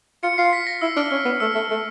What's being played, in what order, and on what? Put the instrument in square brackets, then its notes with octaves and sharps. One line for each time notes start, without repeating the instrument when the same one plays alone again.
[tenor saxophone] F4 [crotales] C#7
[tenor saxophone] F4 [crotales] C7
[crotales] B6
A#6
[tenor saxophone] E4 [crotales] E6
[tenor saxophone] D4 [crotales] F6
[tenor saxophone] C#4 [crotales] F6
[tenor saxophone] B3
[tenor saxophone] A3 [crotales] E6
[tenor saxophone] A3
A3